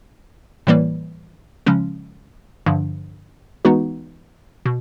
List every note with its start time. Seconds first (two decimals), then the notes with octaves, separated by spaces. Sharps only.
0.67 A2 E3 G3 A#3
1.66 C#3 F3 G#3 C#4
2.66 G2 D3 F3
3.65 E3 G#3 B3 D#4 F#4
4.66 B2